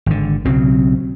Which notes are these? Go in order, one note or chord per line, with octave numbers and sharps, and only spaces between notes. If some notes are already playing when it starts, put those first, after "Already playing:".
G#1 D3
B1 C#3 F#3 C4